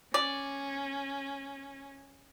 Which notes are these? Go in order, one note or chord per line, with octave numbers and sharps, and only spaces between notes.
C#4 D5